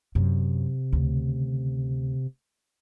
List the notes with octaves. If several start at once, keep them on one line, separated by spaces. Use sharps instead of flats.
F#2 C3
D2 C#3